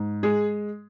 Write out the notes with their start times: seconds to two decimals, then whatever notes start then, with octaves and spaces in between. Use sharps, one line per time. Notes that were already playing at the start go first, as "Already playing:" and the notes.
Already playing: G#2
0.23 G#3 G#4